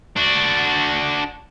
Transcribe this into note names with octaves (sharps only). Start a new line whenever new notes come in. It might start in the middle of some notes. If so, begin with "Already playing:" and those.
D4 F#4